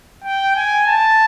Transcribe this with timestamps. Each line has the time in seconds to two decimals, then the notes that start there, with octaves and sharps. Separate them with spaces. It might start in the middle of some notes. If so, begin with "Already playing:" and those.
0.25 G5
0.56 G#5
0.87 A5